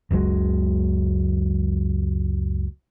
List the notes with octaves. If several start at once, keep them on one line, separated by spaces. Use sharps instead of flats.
F#1 C#2 F#3 G#3